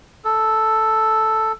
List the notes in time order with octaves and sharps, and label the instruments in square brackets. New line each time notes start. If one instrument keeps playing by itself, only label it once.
[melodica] A4